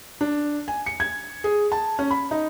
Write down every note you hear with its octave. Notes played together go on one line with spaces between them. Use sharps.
D4
G#5
C#7
G#6
G#4
A5
C#4
B5
D#4